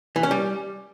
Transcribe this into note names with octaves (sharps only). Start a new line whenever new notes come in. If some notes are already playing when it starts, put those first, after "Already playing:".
E3
C#4
G3